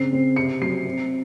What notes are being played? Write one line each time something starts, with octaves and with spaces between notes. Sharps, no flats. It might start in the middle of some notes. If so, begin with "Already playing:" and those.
Already playing: C#3 C4 C7
C4
C3 C#7
F#3 C7
C4